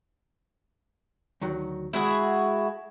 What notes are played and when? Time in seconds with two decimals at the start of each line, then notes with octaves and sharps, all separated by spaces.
1.41 D2 D#3 F#3
1.93 G#3 E4 F#4 G#4